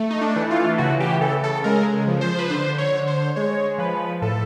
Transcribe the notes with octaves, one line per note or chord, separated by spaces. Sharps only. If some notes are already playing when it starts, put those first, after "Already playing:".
Already playing: A3
D#4
D4
E3
F4
C#3 F#4
G4
C#3 A4
A4
G#3 A#4
F3
C5
B4
D3 C5
C#5
D3
C5
G#3 C#5
F3 B4
A2 A4